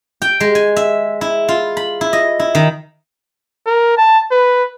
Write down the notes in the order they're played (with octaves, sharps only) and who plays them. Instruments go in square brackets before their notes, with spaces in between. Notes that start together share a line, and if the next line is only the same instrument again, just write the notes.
[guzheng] G5
G#3
G#5
E5
E4
F4
B5
E4
D#5
E4
D#3
[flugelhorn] A#4
A5
B4